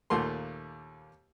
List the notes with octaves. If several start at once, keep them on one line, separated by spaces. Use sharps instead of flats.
D#2 A#2 A3 A#3 C6